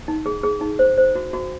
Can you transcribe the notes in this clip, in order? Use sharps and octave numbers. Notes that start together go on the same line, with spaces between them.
D#4
G#4
G#4
D#4
C5
C5
F#4
F#4